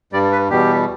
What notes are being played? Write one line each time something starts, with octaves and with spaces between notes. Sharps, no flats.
G2 G3 D5
B4
E2 B2 G3 G4